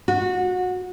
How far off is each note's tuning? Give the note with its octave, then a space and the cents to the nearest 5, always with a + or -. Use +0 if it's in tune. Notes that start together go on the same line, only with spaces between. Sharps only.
F#4 -20